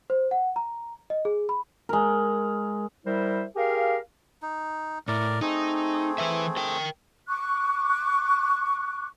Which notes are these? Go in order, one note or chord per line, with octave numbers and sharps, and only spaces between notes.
C5
F#5
A#5
D#5
G#4
B5
G#3 A#4
G3 E4 A#4 C5 E5
G4 G#4 A#4 F5
D#4
A2 A#4 D5
A3 C4 D#4 G#4
E3 B4 E5
A#4 G5
C#6 D6 F#6